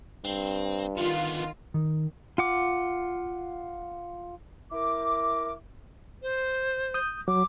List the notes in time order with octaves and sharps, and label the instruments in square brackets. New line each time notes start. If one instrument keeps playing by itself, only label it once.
[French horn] G2 [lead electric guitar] C4
[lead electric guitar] D3 B3 [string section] D#3 F4
[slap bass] D#3
[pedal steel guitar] F4 F#5 D6
[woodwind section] E4 A#4 D6
[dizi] C5
[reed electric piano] D#6 G6
[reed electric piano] F#3 [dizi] D6